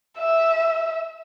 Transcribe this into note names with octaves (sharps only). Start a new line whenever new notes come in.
E5